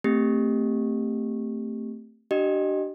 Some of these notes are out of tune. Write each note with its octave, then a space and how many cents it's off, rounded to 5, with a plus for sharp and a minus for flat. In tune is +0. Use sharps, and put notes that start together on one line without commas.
A3 +25 C4 +0 G4 +15
D4 +15 G4 -35 D#5 -15